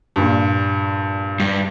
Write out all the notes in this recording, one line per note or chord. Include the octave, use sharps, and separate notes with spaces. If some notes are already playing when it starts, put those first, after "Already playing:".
G2 A#2
G2